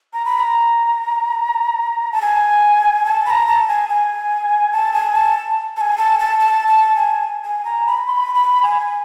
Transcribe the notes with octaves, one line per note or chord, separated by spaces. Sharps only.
A#5
B5
A#5
A5
G#5
A5
B5
A#5
A5
G#5
G#5
A5
G#5
A5
A5
G#5
A5
A5
A5
A5
G#5
G#5
A#5
B5
C6
B5
B5
G#5